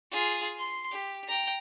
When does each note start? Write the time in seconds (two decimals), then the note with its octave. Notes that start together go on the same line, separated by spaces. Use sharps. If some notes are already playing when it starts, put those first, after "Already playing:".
0.11 F4 G#4
0.59 C6
0.92 G4
1.27 G5 A#5